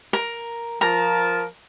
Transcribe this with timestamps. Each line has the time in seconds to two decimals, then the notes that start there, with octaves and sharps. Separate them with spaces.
0.13 A#4
0.81 F3 A#4 A5 A#5